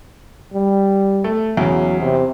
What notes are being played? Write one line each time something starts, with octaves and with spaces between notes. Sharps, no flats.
G3
A3
E2 C#3 F#3
C3